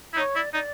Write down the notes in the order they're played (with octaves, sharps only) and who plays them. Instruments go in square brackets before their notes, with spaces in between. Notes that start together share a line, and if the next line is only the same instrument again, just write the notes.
[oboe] E4
[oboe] D#4 [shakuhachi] C#5
[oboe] E4 [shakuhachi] D5
[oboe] D#4 [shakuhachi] D5